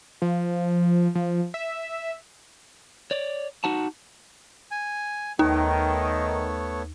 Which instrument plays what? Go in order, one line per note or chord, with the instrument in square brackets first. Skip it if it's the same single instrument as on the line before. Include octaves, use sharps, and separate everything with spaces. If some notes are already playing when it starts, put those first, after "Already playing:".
[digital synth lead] F3
F3
E5
[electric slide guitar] C#5 D5
D#4 F#4 F#5 A5
[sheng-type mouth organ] G#5
[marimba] D#2 [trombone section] D#3 [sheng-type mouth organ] A3 B3 C#5 [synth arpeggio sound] D#4